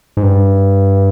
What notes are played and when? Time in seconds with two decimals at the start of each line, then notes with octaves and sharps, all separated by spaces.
0.17 G#2
0.23 G2